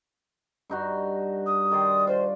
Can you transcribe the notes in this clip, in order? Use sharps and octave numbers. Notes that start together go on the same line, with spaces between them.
G2 D#4 F#4
D#6
D#3 D5 C6
F4 C5